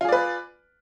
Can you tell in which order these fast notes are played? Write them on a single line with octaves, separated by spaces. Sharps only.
F4 G#4 D5 B4